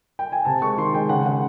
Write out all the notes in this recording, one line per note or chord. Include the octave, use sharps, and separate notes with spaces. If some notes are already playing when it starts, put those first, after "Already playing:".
G5
G#5
C3 A5
G#3 C#6
D#3 C6
G#3 G5
C#3 F#5
C#3 F#5